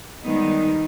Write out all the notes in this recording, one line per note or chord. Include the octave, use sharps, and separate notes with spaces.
D#3 G3 G#3 B3 D#4